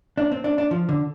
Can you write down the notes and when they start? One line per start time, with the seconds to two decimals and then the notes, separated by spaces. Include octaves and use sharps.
0.18 D4
0.32 C4
0.44 D4
0.58 D4
0.71 F3
0.89 D3